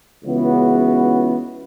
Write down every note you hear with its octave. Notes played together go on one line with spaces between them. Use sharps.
C#2 C#3 E3 B3 F#4